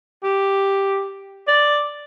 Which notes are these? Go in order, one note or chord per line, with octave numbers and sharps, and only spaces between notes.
G4
D5